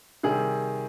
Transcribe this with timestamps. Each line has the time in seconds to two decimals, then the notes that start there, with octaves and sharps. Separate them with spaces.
0.23 C3 D#3 G3 G#4